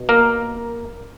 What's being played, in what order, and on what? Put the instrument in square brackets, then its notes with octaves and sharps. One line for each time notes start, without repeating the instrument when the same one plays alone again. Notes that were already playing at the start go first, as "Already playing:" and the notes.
Already playing: [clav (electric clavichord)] B2
A#3 A#4